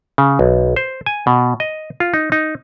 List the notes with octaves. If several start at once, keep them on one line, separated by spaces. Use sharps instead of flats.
C#3
B1
C5
G#5
B2
D#5
F4
D#4
D#4